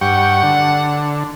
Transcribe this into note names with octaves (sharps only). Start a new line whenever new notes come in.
G2 F#5 G5 C#6
D3